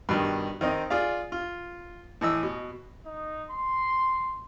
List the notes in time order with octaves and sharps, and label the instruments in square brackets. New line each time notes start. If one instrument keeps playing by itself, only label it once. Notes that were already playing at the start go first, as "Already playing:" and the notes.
[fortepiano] G2 B2 D#3
D#3 C4 D#4
F4 G#4 D5 F5
F4
A2 E3 D#5 E6
B2
[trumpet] D#4
C6